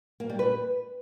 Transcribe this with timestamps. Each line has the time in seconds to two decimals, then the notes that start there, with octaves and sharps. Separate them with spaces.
0.20 A#3
0.30 G3
0.39 B4